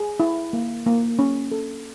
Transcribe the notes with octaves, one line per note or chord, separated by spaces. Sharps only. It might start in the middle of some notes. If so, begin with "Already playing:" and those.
Already playing: G#4
E4
A#3
A#3
C#4
A4